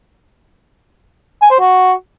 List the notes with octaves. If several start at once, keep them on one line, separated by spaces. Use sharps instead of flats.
G#5
C5
F#4